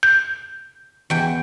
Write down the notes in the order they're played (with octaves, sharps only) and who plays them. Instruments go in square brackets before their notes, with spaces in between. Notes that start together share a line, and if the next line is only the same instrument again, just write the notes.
[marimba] G6
[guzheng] E2 G5